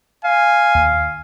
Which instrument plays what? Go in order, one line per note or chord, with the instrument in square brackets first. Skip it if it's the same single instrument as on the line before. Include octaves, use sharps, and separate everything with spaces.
[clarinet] F5 [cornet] G#5
[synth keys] D#2